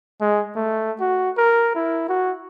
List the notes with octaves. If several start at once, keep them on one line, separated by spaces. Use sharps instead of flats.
G#3
A3
F#4
A#4
E4
F#4